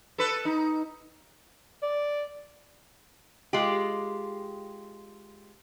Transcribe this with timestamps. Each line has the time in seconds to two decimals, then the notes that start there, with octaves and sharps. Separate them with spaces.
0.18 A4 B4
0.45 D#4
1.83 D5
3.53 G#3 F4 G4